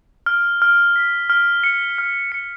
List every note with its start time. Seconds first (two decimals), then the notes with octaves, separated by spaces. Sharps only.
0.26 F6
0.62 F6
0.96 B6
1.30 F6
1.64 C#7
1.98 F6
2.32 C#7